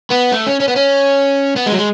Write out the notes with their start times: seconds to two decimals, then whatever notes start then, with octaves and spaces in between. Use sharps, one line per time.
0.11 B3
0.32 A3
0.47 C#4
0.60 C#4
0.68 B3
0.76 C#4
1.56 B3
1.66 G#3
1.72 F#3
1.77 G#3